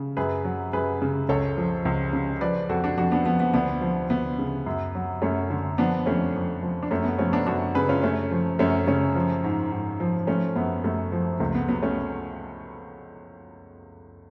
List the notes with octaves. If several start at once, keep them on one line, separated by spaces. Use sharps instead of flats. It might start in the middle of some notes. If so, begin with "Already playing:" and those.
Already playing: C#3
F#2 G#4 B4
F#3
F#2 G#4 B4
C#3
C#2 A4 C#5
F3
C#2
C#3
F3 B4 D5
F2 F#4 A4
D4 F#4
F2 D4 F#4
B3 D4
F3 B3
B3
D2 B3 D4
F3
D2 B3
C#3
F#2
F#3
F#2 A3 C#4
D3
F3 B3 D4
F2 A3 C#4
F2
F3
D4
F#2 A3 C#4
B3
F3 A3 C#4
B3 D4
F#2 D4 F#4
C#3 G#4 B4
C#4 F4
F#2 A3 C#4
F3
F#2 A3 C#4
C#3 A3 C#4
F3
G#2
G#2
F3
F3 A3 C#4
F#2 B3
F#2 A3
F3
C#2 A3
B3
F#3 B3
A3 C#4